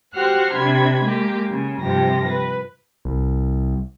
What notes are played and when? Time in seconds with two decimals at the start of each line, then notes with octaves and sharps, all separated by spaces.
0.15 F#4 G4 C5 F#5 F6 F#6
0.53 C3 D4 B5 G#6
1.01 G#3 A#3 G4
1.48 C#3
1.80 G2 C3 F3 G4 A#6
2.26 B4
3.05 C2